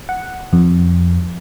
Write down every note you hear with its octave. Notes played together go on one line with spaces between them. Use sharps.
F#5
F2